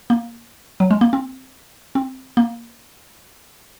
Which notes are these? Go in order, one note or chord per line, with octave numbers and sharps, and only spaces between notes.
A#3
F#3
G#3
A#3
C4
C4
A#3